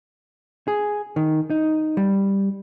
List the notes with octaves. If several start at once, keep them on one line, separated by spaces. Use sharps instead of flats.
G#4
D#3
D#4
G3